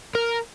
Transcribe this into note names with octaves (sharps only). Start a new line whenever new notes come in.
A#4